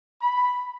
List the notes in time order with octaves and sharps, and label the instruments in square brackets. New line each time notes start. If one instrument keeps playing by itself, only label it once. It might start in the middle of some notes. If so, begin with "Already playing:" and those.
[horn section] B5